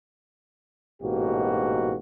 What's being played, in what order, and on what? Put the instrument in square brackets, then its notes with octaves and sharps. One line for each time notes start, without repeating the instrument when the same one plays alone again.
[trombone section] A1 G#2 B2 A#3 F#4 G4